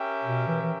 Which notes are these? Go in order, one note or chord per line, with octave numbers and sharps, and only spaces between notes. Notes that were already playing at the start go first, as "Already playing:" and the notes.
Already playing: C#4 G4 A#4 E5 G5
B2
E3
E3